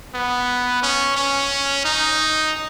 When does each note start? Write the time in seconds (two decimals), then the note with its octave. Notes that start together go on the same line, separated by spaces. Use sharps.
0.14 B3
0.83 C#4
1.17 C#4
1.85 D#4